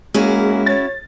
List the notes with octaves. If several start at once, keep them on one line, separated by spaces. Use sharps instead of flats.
G#3 A#3 C#4 E4 F#4 G#4
C#5 A6